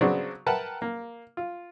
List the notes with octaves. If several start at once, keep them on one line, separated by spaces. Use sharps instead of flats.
C#3 F#3 B3 C4 D4
A#4 B4 E5 F#5 G5 A5
A#3
F4